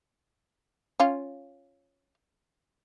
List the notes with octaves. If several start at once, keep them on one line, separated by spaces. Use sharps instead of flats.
C#4 F4